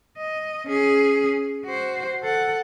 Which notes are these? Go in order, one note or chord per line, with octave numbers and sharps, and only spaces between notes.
D#5
C#4 G#4
F#4 C5
A4 F#5